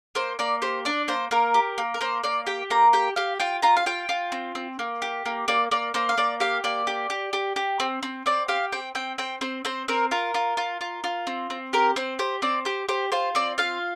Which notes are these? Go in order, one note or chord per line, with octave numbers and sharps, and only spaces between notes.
A#3 C5
A#3 D5
G4 C5
D4 D5
A#3 C5
A#3 A#4
G4
A#3
A#4
A#3 C5
A#3 D5
G4 G5
A#3 A#5
G4 G5
G4 F5
F4 G5
F4 A#5
F5
F4 G5
F4
C4
C4
A#3
G4
A#3
A#3 D5
A#3 D5
A#3 C5
F5
A#3 D5
G4 F5
A#3 D5
G4
G4
G4
G4
C4
C4
C4 D5
G4 F5
C4 G5
C4 G5
C4 G5
C4 C5
C4 C5
C4 A#4
F4 A#4
F4
F4
F4
F4
C4
C4
G4 A#4
C4 C5
G4 C5
C4 D5
G4 C5
G4 C5
F4 C5
C4 D5
F4 F5